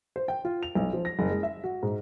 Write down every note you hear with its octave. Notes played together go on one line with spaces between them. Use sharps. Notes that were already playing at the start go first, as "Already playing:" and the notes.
C5
G5
F4
F7
B1
F3
A#6
F#1
G#3
E5
F#4
G#2